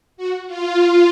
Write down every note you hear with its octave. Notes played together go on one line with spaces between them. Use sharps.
F#4
F4
F4